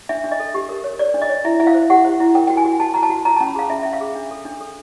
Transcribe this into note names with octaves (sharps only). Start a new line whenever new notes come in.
D4 E5
D4
D#5
A4
G4
A#4
C#5
C#5 D5
D4
D#5
C#5
E4 E5
E4 E5
F5
C5
G4 F#5
C5
E4
A#4 G5
F#4 G5
G#5
F#4
F#4 A5
F#4 A#5
A5
F#4
F4 A#5
C#4 A5
B5
G#4 F5
C#4 E5
C#4 E5
F5
G#4
D4
A4
D4
A4